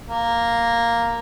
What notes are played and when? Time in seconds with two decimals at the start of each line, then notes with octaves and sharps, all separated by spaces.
0.07 A#3